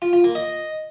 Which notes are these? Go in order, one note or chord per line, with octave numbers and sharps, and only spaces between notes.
F4
F4
A#3
D#5